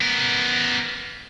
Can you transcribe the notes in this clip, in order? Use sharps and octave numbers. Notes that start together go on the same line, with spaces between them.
B3 A#4